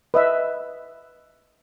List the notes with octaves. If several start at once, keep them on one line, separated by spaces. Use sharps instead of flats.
B4 D#5 E5